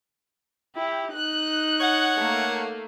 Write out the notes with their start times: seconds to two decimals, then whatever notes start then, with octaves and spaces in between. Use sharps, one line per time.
0.76 E4 G4
1.14 D#4 F#6
1.81 C#5 F#5
2.17 A3 A#3